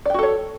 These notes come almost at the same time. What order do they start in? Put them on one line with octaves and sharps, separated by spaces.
D5 G5 F#4 A4 C#5